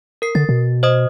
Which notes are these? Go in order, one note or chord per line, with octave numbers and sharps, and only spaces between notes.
A#4 C7
D3 A6
B2
C5 D#5 D#6